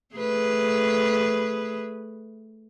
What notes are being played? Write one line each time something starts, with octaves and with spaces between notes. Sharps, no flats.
A3 G#4 B4